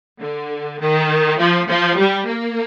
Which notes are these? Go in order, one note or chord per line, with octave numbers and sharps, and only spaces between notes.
D3
D#3
F3
F3
G3
A#3